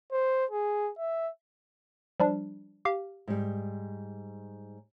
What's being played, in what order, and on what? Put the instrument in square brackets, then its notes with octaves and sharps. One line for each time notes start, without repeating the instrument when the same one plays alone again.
[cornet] C5
G#4
E5
[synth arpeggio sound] F3 G3 D4
G4 F5
[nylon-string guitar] G#2 G3